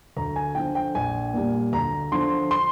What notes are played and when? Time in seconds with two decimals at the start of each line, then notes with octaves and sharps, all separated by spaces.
0.17 D2 A#5
0.36 G#5
0.55 D3 F3 G5
0.75 G5
0.95 A#1 G#5
1.34 A#2 G3
1.73 D2 A#5
2.12 D3 F3 C6
2.51 C6